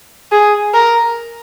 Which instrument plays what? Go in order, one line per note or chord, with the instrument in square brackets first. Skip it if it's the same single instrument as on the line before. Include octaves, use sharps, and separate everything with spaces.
[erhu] G#4
A#4